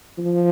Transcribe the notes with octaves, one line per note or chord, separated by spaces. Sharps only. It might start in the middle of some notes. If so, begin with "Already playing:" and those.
F3